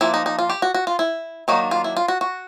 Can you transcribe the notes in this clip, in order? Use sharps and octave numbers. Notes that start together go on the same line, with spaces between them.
F3 A#3 D4 E4
D#4
D#4
F4
G4
F#4
F#4
F4
E4
D#3 F#3 A#3 D4 D#4
F4
E4
F4
F#4
F#4